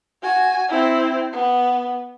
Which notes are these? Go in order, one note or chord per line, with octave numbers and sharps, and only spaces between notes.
F#4 G#5
C4 E4
B3